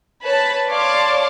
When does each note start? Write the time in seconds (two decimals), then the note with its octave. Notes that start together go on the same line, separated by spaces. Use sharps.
0.23 B4 C#5 A5 B5
0.69 C#5 D5 F5 A5 C6 D6